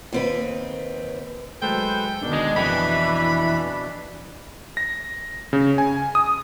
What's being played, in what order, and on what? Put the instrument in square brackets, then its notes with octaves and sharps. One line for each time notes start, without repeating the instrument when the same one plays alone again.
[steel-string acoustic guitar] D#2 C4 B4
[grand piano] F#3 G#3 [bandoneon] A4 B4 C5 [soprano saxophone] G5
[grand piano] D2 D#3 B3 [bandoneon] B2 D4
[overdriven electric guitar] G#3
[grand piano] F2 G5 C#7 [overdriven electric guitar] E3 [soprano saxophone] B5
[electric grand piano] A#6
C#3
G#5
D#6